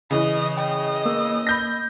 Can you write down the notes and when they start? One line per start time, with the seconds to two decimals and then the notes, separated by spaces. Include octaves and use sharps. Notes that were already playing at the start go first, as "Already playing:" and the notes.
0.11 C#3 E3 D#5
0.57 D#5 G5
1.06 A#3 E6
1.47 B5 G6 A#6